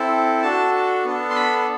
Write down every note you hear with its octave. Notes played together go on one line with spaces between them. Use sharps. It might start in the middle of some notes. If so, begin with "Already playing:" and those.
Already playing: C4 E4 A4
D4 F#4 A4 A5
B3 D4 A4
C6
B5